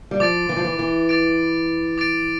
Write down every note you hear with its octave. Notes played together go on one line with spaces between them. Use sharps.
G3
F3 D6 A6 D7
E3
F3
E3
E3
D6 A6 D7
D6 A6 D7